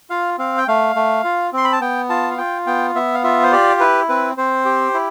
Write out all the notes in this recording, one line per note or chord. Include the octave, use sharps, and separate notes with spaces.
F4 F5
C4 F5
G5
A3 F5
A3
F4
C4 C6
B5
A5
B3 G5
F4 A5
F5
F4 G5
B3 G5
B3 E5
F5
F4 E5
C5
G4 D5
E4 B4
C4 B4
C4 C5
G4
E4